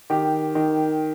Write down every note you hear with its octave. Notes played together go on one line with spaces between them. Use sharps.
D#3 G4
D#3